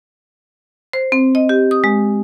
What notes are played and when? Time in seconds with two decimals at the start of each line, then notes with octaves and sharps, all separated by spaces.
0.93 C5
1.12 C4
1.35 D#5
1.49 G4
1.71 D#6
1.84 G#3